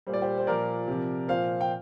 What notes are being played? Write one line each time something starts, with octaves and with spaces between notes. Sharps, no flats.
A#2 G3 C5
D5
G4 C5
C5
A#2 F3 A#4 D5
C3 F3
A#2 F3 C5 F5
G5